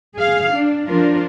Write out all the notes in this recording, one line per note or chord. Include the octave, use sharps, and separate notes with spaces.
G#4 F5
D4
F3 D4 F4 A#4